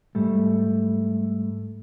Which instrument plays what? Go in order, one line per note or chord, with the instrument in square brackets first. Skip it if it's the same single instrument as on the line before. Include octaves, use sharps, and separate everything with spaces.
[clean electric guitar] G#2 G3 A3